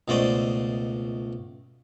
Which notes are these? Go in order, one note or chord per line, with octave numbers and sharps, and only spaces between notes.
C#2 B2 A3 C5 D5 D#5